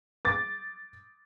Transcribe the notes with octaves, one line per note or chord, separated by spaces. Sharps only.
D6 A6